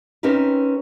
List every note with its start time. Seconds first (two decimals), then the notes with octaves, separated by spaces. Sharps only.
0.23 C4 C#4 D#4 G4 A#4 B4